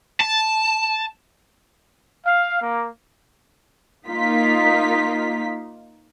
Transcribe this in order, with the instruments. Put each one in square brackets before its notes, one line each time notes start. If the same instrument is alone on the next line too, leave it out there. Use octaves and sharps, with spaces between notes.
[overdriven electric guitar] A5
[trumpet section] F5
A#3
[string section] A#3 D#4 F4 B6